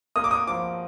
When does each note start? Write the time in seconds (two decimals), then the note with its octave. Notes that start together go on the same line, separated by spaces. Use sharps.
0.16 A#3 D#6
0.24 D6
0.31 D#6
0.47 F3 D6